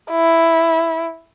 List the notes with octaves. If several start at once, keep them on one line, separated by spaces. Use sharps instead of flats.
E4